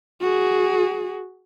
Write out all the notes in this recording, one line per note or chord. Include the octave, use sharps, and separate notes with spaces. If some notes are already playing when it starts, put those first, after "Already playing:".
F#4 G#4